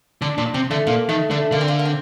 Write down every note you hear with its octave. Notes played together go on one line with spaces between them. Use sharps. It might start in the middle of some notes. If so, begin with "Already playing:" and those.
D3 D4
A#2 D4
C3 C4
D3 A3
A#2 A#3
D#3 A3
D3 A3
D3 A#3
C4
A#3
A#3
C4